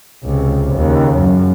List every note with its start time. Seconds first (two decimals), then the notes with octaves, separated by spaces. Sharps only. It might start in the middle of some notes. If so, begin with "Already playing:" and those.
0.24 C#2 C3
0.75 D#2 C#3
1.18 F#2